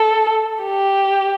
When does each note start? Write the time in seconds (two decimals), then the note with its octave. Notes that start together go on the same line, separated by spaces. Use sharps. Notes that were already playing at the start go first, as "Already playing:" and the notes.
Already playing: A4
0.62 G4